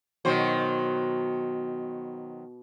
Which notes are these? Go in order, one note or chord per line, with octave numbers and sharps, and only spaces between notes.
B2 D#3 F#3 C5